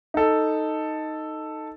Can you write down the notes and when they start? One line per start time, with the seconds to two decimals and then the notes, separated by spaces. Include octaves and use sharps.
0.14 D#4 A4